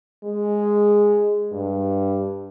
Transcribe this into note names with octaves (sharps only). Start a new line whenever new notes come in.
G#3
G2